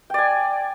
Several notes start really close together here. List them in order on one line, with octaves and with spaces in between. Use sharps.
G5 D5 G#5